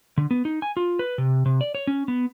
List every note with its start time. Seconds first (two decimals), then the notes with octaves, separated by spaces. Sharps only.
0.18 D3
0.31 B3
0.45 D#4
0.62 G#5
0.77 F4
0.99 B4
1.18 C3
1.46 C3
1.61 D5
1.75 C#5
1.87 C#4
2.08 B3